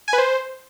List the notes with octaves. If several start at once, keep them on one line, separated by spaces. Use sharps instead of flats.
G#5
B4
C5